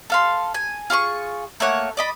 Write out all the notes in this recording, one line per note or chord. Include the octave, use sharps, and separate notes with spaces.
A4 F5 C6
G#5
F4 G#4 C6 C#6
A3 A#3 C#5 F#5
D5 D#5 B5